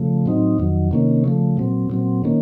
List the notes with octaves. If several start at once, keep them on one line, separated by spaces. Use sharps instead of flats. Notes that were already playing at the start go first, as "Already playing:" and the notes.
Already playing: C#3 F3 A3
A2 F#3 C4 D#4
F2 D#3 F#3
C3 D#3 A#3 C#4
C#3 F3 A3
A#2 F#3 C4
A#2 F#3 C4
D#3 A#3 C#4